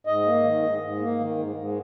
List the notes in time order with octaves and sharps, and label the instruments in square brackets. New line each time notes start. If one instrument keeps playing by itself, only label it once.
[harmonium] G#2 D#5
A#3
D#3
G#2
G#2
A#3
D#3
G#2
G#2